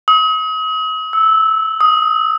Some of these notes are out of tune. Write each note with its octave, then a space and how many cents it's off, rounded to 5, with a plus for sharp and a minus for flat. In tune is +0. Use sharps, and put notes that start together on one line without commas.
D#6 +35
E6 -15
D#6 +10